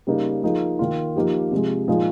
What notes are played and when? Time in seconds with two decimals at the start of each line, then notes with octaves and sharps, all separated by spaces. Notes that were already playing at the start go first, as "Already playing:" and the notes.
0.07 C#3 G3 A#3 D#4
0.43 F3 A#3 D#4 G#4
0.79 D#3 A#3 F4
1.16 F3 A#3 D#4 G4
1.52 C3 F3 G#3
1.88 A#2 F3 G#3 D#4 G#4